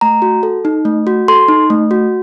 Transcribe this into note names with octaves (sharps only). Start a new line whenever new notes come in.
A3 A#5
F#4
A4
D#4
A3
F#4
A4 C6
D#4
A3
F#4